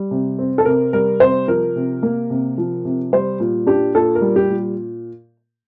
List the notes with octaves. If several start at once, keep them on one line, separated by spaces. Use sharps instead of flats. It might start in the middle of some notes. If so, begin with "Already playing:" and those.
Already playing: G3
C3
C4
A4
C3 A#4
G3 A#4
C3 C5
F3 A#4
C3
A#3
C3
F3
C3
G3 C5
A#2
D4 G4
A#2 A4
A#4
G3
G4
A#2